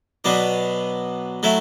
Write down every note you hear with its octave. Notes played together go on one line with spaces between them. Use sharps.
B2 F#3 B3 D4
F#3 A3 E4